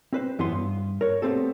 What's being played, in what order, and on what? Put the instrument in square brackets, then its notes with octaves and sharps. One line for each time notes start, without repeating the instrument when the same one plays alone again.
[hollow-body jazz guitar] C4 B4 C5
F#2 E3 B3 B4 C6
G2
A#4 C#5
A3 B3 C4 G4 A4